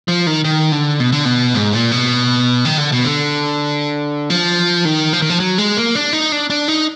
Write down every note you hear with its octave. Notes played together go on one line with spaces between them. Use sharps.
F3
D#3
D#3
D3
B2
D3
B2
G#2
A#2
B2
D#3
D3
B2
D3
F3
D#3
F3
D#3
F3
F#3
G#3
A#3
D4
D#4
D4
D4
D#4